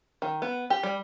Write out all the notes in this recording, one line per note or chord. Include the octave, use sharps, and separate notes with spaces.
D#3
B3
G4
G3